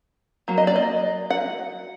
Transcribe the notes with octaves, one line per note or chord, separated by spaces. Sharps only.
F#3 A#3
D#5
D5
D#5
F#5